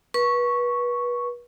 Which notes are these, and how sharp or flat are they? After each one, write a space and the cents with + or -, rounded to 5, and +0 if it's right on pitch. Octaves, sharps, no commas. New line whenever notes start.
B4 -30 C#6 +0